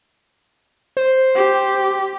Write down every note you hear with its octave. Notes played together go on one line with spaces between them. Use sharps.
C5
G4